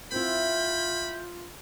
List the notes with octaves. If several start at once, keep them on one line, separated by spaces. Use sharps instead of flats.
C4 E4 F4 B5 G6